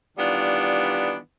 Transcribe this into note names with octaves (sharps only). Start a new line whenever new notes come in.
D#3 E3 G3 B3 D4 F4